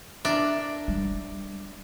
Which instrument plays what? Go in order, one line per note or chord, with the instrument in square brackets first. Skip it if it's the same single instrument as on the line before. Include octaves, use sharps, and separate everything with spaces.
[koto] D4 [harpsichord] E4 A#4 B4 [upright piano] D6
[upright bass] G3